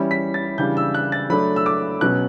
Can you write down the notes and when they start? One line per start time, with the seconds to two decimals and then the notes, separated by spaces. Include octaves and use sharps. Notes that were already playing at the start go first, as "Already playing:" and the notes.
Already playing: E3 G3 C#4 E4
0.11 B6
0.34 A6
0.58 C#3 E3 G3 D4 G6
0.77 E6
0.94 F#6
1.12 A6
1.30 F#3 A3 D4 B5
1.56 E6
1.66 D6
2.01 B2 F#3 C#4 F#6